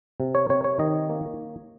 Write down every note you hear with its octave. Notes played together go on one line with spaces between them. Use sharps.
C3
C#5
C3 C#5
C#5
D#3 D#5
A#3